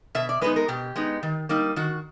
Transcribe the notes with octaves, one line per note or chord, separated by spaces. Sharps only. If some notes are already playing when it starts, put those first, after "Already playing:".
B2 E5
D5
G#3 B3 D#4 B4
A#4
B2 G4
G#3 B3 D#4
D#3
G3 A#3 D#4
D#3 F#4